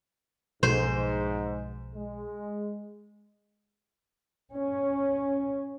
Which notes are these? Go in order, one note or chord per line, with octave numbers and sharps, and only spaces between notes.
B1 G#2 B2 F3 C5
G#3
C#4